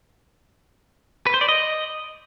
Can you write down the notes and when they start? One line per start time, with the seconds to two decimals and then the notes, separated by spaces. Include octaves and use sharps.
1.27 B4
1.34 C5
1.41 D5
1.48 D#5